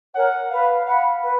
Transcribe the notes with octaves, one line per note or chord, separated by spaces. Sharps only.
A#4 C#5 F#5 G#5
B4 F5
F5 F#5 B5
B4